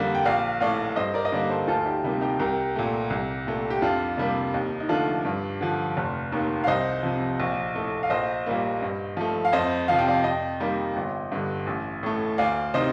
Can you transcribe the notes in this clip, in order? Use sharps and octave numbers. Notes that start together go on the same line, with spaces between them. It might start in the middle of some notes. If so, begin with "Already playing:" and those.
Already playing: F2 D3 G3 A#3
G5
A#1 D5 F5
A2 A3 D5 F5
G2 C5 D#5
A#4 D5
D#5
D3 G3 A#3 A#4 D5
A4 C5
D2 F4 A4
D#4 G4
C3 G3 A#3 D#4
D#4 G4
C2 G4 A#4
A#2 A3
C2
A#2 A3
G4
F2 D4 F4
C3 G3 A#3 D4
D#2 D#4
D#4
D3 F3 A3 D4 F4
G2
D3 F3
F1
D#2 D#3 A#3
F5
C2 C5 D#5
C3 F3
A#1
A2 A3
F5
A#1 C5 D#5
A#2 G3 A#3
G2
F3 A3
F5
F2 C5 D#5
C3 F3 F5
G5
D5 F5
F2 D#5 G5
D#3 G3 A#3
G1
G2 D3
A1
A2 A3
D2 D5 F5
C3 D#3 C5 D#5